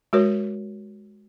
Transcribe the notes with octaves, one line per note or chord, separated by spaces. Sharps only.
G#3 F#4 A#4 C#5